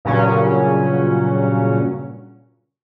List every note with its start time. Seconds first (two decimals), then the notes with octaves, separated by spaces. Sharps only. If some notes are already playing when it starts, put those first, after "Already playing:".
0.05 G2 A#2 C#3 F#3 C#4